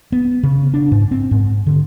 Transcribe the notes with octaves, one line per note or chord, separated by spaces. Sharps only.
B3
C#3
D4
G#2
C4
G#2
D3